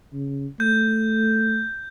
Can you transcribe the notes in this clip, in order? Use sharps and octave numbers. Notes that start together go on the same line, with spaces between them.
C#3
A3 G6